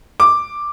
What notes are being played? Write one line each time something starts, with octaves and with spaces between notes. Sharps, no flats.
D6